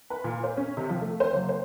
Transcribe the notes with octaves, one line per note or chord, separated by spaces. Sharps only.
B4
A#2
C5
C#4
C3
F3
A3
C5
F#1
C5